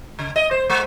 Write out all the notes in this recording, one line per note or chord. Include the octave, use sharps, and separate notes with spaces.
C#3
D#5
C5
G#3